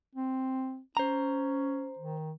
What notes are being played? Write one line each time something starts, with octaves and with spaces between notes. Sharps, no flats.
C4
C#4 C5 A#5
D#3